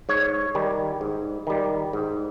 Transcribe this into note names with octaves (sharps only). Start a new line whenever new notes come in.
G#2 C#5
D#3 G3
G#2
D#3 G3
G#2